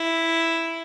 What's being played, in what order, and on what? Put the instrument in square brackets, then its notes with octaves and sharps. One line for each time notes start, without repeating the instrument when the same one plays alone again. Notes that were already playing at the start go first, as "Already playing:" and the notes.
Already playing: [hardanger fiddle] E4